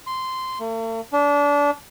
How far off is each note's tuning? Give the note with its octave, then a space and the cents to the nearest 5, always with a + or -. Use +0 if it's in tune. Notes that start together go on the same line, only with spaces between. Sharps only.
C6 -10
A3 +45
D4 -25